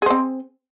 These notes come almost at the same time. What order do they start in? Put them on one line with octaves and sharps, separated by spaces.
G#4 C5 C4